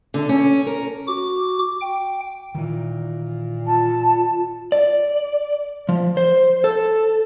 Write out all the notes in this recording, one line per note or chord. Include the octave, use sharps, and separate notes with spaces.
D3
C#4
A#4
F#4 D6
G5
A#2 D#3 E3
F4 A5
D5
F3
C5
A4